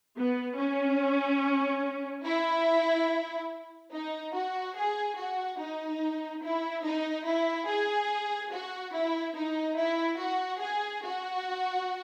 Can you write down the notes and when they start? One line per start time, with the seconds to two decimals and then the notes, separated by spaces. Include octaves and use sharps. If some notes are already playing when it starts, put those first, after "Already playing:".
0.17 B3
0.58 C#4
2.25 E4
3.93 D#4
4.35 F#4
4.77 G#4
5.19 F#4
5.60 D#4
6.43 E4
6.85 D#4
7.28 E4
7.70 G#4
8.53 F#4
8.94 E4
9.37 D#4
9.78 E4
10.20 F#4
10.62 G#4
11.05 F#4